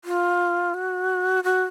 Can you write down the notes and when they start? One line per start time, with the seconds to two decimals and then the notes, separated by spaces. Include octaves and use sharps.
0.05 F4
0.74 F#4
1.44 F#4